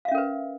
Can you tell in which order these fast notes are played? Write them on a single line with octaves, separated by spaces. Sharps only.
F5 E5 C#4 A#4 B4